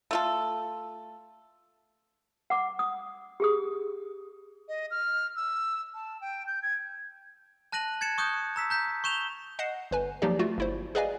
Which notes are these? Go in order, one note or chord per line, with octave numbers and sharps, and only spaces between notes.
A3 F4 A4
F#5 D6
D#6
G4 G#4 D#6
D#5
F6
E6
A5
G5
G6
G#6
A5 F#6 A#6 D#7 F#7
G#6 A6 C#7 E7
C#6 D#6 F#6 G6
A#5 E6 B6
A#5 G6 B6
C#6 G6 E7 F7 G7
D#5 F#5 F#6 C7 E7
G1 B4 G#5
F3 F#3 A#3 D#4 G4 D5
A3 F4 F#4
G1 E4 C5
G#4 B4 D5 D#5 F5 G#5